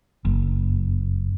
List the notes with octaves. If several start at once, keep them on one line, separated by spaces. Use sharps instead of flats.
F#1